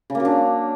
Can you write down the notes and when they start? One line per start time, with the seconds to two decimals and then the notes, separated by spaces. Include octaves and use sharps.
0.10 C#3
0.15 A#3
0.20 F#3
0.25 D4